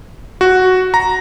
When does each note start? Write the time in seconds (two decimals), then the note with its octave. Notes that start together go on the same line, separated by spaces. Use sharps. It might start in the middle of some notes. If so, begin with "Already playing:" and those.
0.41 F#4
0.94 A#5